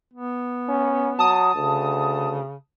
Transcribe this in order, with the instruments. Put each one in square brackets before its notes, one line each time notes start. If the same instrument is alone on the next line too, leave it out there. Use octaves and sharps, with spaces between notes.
[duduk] B3
[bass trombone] C#4
[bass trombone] F#3 [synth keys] A5 D#6
[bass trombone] D2 [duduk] C#3